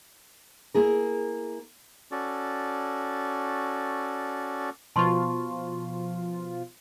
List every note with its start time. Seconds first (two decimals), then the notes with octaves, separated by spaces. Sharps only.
0.74 A#3 E4 G#4 A#4
2.12 C#4 F#4 A4 D5
4.96 B2 F3 F4 A5 C6 C#6